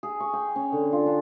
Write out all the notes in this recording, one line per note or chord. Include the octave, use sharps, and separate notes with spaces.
G#4
C#6
G5
C#4
D3
F4
D4